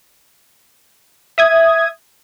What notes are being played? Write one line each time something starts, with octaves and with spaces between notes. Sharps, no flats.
E5 D#6 G#6